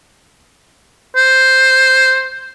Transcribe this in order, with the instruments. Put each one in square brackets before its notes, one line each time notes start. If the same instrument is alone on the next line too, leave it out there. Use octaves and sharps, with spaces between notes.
[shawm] C5